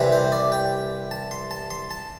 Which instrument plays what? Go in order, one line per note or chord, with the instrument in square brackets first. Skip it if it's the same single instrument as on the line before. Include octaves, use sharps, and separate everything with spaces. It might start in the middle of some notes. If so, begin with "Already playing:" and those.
Already playing: [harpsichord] C2 C3 E3 G3 C4
C5
D5
G5
A5
C6
A5
C6
A5